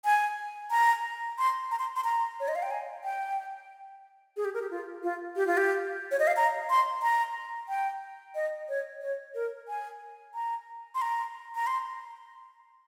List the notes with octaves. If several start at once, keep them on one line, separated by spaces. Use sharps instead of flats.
G#5
A#5
C6
A#5
C6
C6
A#5
C#5
D#5
F5
G5
G#5
G5
G#4
G4
A#4
G4
F4
F4
G4
F4
G4
C#5
D#5
F5
A#5
C6
A#5
G5
D#5
C#5
C#5
A#4
G#5
A#5
C6
A#5
A#5
C6